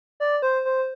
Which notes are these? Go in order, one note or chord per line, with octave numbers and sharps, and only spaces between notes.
D5
C5
C5